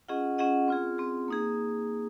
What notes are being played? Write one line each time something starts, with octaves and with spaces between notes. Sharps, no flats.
C#4 F4 G#4 D#5 F#5
C#4 F4 G#4 D#5 F#5
C4 F4 G#4
C4 F4 G#4
A#3 D#4 G#4